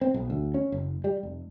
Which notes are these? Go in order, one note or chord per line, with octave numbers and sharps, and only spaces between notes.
C4
B1
D2
C#4
F#1
G3
F1